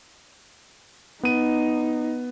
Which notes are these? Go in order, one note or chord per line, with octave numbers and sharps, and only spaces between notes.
B3 D#4 D#7